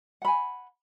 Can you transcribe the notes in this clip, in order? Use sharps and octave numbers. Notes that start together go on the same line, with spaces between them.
F#5 G#5 B5